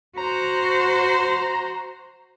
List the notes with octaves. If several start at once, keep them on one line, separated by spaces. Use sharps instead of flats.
F#4 C5 A#5